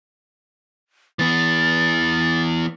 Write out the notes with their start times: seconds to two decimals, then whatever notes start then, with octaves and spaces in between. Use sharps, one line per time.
1.19 E3 B3 A6